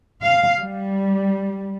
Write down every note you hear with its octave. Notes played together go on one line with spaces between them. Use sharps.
F5
G3